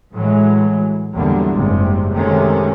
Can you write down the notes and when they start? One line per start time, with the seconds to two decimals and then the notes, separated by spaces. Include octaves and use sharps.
0.14 A2 E3 F#3 G#3
1.15 E2 A#2 D3 F#3 G3 A#3
1.54 F#1 G#2 C3 G3
2.13 C3 D#3 G#3 A3 C#4